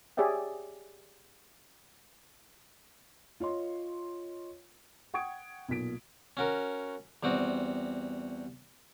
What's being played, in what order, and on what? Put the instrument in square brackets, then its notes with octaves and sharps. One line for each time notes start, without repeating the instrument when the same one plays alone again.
[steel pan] G4 G#4 C#5 D5 E5 G5
[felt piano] F4 C#5 D#5 C6
F#5 G5 C#6 D#6 G#6 D7
B1 A#2 A#3 B6 D7
[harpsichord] C#4 F#4 A#4
E2 G3 C4 F#4